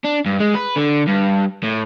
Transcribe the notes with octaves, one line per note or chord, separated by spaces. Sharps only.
D4
G2
G#3
B4
D3
G2
A2